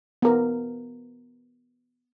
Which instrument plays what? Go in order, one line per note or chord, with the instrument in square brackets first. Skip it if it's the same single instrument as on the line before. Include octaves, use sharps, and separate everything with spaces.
[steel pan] B3 A#4